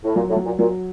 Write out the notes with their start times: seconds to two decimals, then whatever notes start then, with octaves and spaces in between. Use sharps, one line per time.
0.04 A2
0.16 A#2 F#3
0.29 A2
0.36 F#3
0.45 A#2
0.59 A#2 F#3